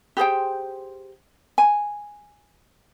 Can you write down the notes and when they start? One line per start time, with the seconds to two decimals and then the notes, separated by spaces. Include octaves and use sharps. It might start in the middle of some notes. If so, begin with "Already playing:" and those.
0.17 G4 G#4 C5 G5
1.58 G#5